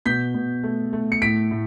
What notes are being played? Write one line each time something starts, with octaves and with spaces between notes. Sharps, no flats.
B2 G6 B6
B2
A3
A3
C#7
A2 B6 D7
A2